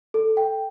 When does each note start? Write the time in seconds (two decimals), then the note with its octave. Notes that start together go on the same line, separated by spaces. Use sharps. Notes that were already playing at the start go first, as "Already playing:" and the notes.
0.14 A4
0.37 G5